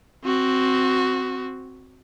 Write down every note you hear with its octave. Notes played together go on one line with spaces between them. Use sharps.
C4 F#4